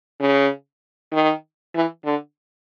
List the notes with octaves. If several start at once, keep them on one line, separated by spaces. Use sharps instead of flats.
C#3
D#3
E3
D3